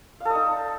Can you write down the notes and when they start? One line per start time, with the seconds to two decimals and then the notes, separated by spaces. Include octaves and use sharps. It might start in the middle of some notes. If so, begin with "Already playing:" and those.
0.20 F5
0.25 A4
0.30 D#5
0.35 D#4